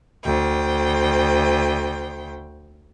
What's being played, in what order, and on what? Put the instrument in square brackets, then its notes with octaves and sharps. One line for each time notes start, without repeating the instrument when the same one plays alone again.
[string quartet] D2 C5 G5